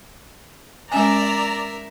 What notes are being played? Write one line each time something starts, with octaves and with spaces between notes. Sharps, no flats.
G#3 C#4 A#4 D5 E5 G#5 A#5